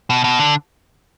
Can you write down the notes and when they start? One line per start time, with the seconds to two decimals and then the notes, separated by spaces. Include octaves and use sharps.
0.10 B2
0.24 B2
0.39 D3